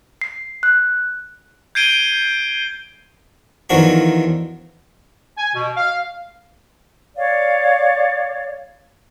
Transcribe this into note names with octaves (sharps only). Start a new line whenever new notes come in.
C7
F#6
G6 G#6 C7 D7 D#7 G7
E2 D#3 F3 D4 F#4 C#6
G#5
B2
F5
C#5 D5 F5